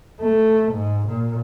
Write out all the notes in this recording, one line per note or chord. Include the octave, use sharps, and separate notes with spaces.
A3
G#2
A#2